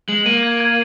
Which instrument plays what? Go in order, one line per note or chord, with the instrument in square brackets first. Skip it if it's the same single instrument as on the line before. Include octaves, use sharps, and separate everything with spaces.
[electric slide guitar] G#3 [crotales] F#7
[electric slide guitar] A#3 [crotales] D#7
[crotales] G#6
G#6